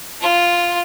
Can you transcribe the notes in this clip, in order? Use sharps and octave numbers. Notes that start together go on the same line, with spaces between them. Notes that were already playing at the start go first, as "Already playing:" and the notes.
F4